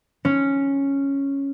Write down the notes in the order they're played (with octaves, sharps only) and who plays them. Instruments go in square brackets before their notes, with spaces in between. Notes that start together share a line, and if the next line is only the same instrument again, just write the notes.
[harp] C#4